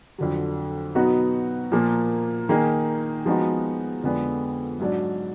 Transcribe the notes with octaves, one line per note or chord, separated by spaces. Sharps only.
F2 D3 F#3
B2 F#3 B3 D#4 F#4
A#2 F3 A#3
D#3 A#3 D#4 G#4
F3 G#3 B3 D#4 F#4
F2 D3 G#3 B3 D4
G#2 F#3 D4